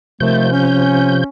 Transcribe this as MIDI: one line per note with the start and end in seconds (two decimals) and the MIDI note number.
0.20 0.47 39
0.20 1.24 48
0.20 1.24 53
0.20 0.47 57
0.20 1.24 91
0.52 1.27 61